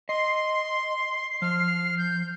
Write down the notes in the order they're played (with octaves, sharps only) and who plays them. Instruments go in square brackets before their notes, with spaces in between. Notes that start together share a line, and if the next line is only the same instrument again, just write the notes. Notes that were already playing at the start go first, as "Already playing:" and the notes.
[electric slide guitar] D#5 [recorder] C6 [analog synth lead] C7
[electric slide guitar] F3 [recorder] F6
[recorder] G6